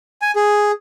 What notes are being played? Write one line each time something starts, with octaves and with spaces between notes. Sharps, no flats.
G#5
G#4